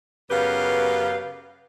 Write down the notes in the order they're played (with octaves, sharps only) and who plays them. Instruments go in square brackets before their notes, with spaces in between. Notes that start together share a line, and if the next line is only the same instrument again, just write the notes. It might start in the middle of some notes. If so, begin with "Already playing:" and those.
[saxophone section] F#2 C#3 B3 G4 B4 F5